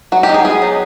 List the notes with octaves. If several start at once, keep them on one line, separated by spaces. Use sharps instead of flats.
F#3 F#4
G4
D#4
G#4
B3 G#4
F#3